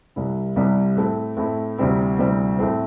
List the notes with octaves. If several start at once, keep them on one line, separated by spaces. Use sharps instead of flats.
C2 C3 G3 E4
C2 C3 G3 E4
A2 A3 C4 E4
A2 A3 C4 E4
D2 C3 G3 C4 E4
D2 C3 G3 C4 E4
A2 A3 C4 E4